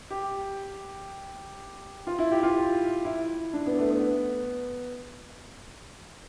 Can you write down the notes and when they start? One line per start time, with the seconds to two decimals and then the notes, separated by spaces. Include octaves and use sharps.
0.10 G4
2.07 F4
2.19 E4
2.31 G4
2.43 F4
3.05 E4
3.53 D4
3.66 B3
3.79 A3
3.90 B3